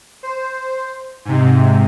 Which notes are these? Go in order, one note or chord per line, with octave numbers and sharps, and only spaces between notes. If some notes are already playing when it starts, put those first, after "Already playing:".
C5
G#2 C3